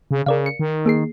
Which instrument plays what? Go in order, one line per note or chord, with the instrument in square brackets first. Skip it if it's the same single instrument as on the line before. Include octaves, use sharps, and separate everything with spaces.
[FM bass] C#3
[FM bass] C#3 [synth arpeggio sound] A#4 D5 F5
[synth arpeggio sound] C#7
[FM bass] D#3
[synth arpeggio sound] A#3 G#4 C7